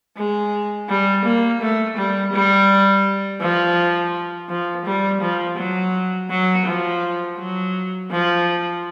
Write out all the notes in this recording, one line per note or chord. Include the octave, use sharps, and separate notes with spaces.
G#3
G3
A#3
A3
G3
G3
F3
F3
G3
F3
F#3
F#3
F3
F#3
F3